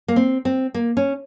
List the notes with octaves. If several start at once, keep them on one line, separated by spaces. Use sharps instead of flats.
A#3
C4
C4
A#3
C#4